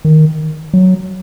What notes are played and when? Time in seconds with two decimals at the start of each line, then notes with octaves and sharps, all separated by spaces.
0.05 D#3
0.73 F#3